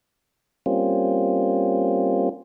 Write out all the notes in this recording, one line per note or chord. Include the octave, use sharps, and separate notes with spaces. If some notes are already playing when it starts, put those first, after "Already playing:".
G3 A#3 C4 C#4 F4